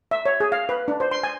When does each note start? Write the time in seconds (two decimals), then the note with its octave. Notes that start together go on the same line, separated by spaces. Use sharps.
0.11 E5
0.26 C#5
0.40 G#4
0.52 F5
0.69 B4
0.88 D4
1.00 C5
1.11 C6
1.23 G#5